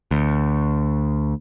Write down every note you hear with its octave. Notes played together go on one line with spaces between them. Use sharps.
D2